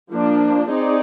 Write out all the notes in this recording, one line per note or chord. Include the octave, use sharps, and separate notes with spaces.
F3 A#3 D4
C4 D#4 G#4 D5